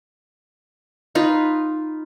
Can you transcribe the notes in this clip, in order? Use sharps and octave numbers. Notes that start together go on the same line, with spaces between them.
D#4 F4 B4